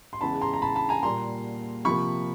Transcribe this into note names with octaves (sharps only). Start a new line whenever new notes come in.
C6
E2 C#3 E3 G#3 A5 B5
A#5 C6
A#5
A5 B5
A5 B5
G#5 A#5
A#2 G3 A#3 A#5 C6
C3 F3 A#3 B5 C#6